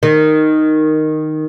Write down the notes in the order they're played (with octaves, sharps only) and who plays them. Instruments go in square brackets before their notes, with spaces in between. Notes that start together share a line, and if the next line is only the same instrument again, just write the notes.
[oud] D#3